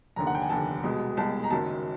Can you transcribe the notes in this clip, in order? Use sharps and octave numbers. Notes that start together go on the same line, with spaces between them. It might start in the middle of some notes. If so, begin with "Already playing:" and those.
F1 D#2 D3 A#5
F#5
G5
G#5
F1 D#2 D3 A5
C2 B2 G#3
C2 B2 G#3 A5
A#5
F#1 F#2 D#3 F#3 A5